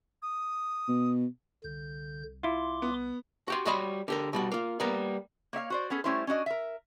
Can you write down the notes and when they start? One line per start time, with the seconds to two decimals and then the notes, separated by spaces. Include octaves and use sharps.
0.22 D#6
0.88 B2
1.64 C2 D3 G6
2.43 E4 F4 C6 D6
2.82 B3
3.48 F#4 G4 C6
3.65 G3 F#4 C#5 D#5 B5 C6
4.08 D3 G4 A#4
4.33 B2 G3 F#4
4.52 A#3 F4
4.80 G3 A#3 B3 A#4
5.53 A#3 C#5 E5 F5
5.70 F#4 C5 D5
5.90 B3 C#4 G#4 A4
6.04 G3 A3 C#4 E4 A#4 C5
6.27 C#4 D4 F#4 D#5
6.46 A#4 E5